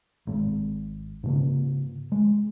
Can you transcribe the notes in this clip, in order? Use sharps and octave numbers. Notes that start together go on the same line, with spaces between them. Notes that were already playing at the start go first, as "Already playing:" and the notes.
G#1 G#2
G#2 C#3 A#3
G#3